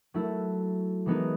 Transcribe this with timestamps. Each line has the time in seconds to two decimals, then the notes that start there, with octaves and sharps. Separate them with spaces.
0.14 F#3 A3 E4
1.06 E3 G#3 B3 D#4